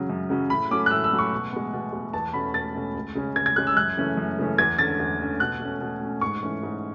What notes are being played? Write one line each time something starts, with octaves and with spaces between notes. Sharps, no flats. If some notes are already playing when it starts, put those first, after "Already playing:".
Already playing: C#3 F#3 C#4
F#2
C#3 F#3 C#4
A2 B5
F#3 A3 C#4 D6
F#6
A2 E6
E6
F#3 A3 C#4
C#6
B2
G#3 B3
B2
G#3 B3
E2 A5
B2 A3 C#4 B5
E2 A6
B2 A3 C#4
C#2
C#3 G#3 C#4
C#2 G#6
G#6
C#3 G#3 C#4 F#6
E6
F#2 F#6
C#3 E3 A3 C#4
F#2
C#3 E3 A3 C#4
E2 G#6
D3 A3 C#4 A6
E2
D3 A3 C#4
B2 F#6
A3 C#4
B2
A3 C#4
G#2 C#6
E3 A3 C#4
G#2